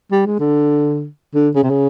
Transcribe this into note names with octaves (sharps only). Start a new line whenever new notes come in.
G3
G#3
D3
D3
C#3
C3
C#3